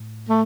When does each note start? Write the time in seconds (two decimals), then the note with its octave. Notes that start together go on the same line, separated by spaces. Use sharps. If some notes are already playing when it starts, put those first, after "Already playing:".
Already playing: A2
0.30 A3